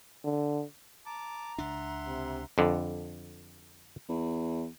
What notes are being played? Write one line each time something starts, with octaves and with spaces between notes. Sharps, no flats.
D3
A5 A#5 D6
C#2 D4 E5 F#5 C6
C3
F2 D3
E2